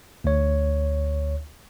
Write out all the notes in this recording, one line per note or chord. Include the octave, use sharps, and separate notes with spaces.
D2 C#5